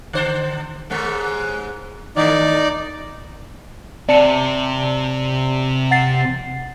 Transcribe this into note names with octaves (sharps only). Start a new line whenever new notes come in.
D3 C5
D#2 G#2 G#3
D#3 A3 D#4 D5
C3 D5 A5 C#7
F#5 A6 C7